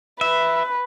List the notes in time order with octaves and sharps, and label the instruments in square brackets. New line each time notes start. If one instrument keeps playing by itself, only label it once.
[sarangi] B4 [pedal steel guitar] E5